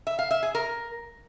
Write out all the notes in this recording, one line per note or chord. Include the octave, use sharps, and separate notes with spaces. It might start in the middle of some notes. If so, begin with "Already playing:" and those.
E5
F5
E5
G#4
A#4